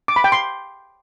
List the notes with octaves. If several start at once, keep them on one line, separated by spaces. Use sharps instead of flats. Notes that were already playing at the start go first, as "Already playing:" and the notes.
D6
B5
G5
C6